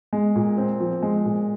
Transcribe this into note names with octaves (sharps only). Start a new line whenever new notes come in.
G#3
A#2
C4
F3
G#3
A#2